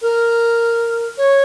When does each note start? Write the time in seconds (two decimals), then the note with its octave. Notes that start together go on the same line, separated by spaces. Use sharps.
0.02 A#4
1.17 C#5